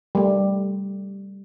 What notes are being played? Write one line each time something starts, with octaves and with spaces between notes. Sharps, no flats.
G3 A3